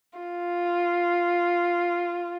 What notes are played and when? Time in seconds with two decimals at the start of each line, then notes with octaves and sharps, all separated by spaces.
0.19 F4